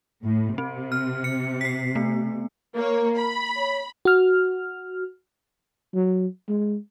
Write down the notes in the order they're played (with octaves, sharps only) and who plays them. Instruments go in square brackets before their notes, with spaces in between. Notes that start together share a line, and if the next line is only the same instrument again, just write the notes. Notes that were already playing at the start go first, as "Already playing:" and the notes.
[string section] A2
[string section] C3 [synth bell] C4
[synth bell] F6
C#7
B6 C7
A3 B3
[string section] A#3 C#5 [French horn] A#4
[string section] B5
[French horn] C#5
[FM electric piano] F#4 F6
[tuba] F#3
G#3